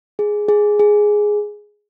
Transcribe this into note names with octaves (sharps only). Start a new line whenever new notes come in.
G#4
G#4
G#4